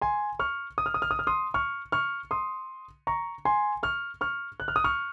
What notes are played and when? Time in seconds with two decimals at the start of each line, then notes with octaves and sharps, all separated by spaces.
0.02 G#5 C6
0.39 C#6 F6
0.78 D#6
0.86 F6
0.94 D#6
1.02 F6
1.11 D#6
1.19 F6
1.27 C6 D#6
1.54 C#6 F6
1.92 C#6 F6
2.31 C6 D#6
3.07 A#5 C#6
3.45 G#5 C6
3.83 C#6 F6
4.21 C#6 F6
4.60 F#6
4.68 F6
4.76 D#6
4.84 C#6 F6